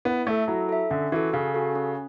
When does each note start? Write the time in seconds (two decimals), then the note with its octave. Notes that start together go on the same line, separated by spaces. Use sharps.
0.05 B3 E4
0.26 A3 A4 E5
0.48 F#3 E4
0.69 A4 E5
0.90 D3 C#4
1.12 E3 F#4 A4
1.33 C#3 C#4
1.54 F#4 A4
1.75 C#4